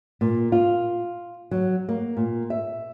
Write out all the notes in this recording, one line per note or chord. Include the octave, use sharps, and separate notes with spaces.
A#2
F4
F#3
A#3
A#2
E5